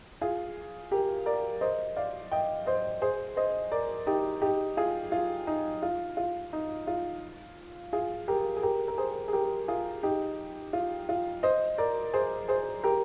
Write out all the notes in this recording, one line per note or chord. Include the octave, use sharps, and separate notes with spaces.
F4 G#4
G4 A#4
A#4 D5
C5 D#5
D5 F5
D#5 G5
C5 D#5
G#4 C5
C5 D#5
A#4 D5
D#4 G4
D#4 G4
F4 G#4
F4
D#4
F4
F4
D#4
F4
F4 G#4
G4 A#4
G#4
G4 A#4
A#4
G#4 C5
G#4
G4 A#4
F4 G#4
D#4 G4
F4
F4
C5 D#5
A#4 D5
G#4 C5
G#4 C5
G4 A#4